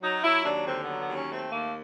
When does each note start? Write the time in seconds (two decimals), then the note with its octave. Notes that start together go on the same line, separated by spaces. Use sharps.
0.02 F#3 D#4
0.23 F#3 E4
0.44 D#2 D4
0.66 D3 C4
0.82 B3
0.87 F#3
0.99 B3
1.08 D#2
1.14 C#4
1.30 A3 C4
1.52 D#2 A#3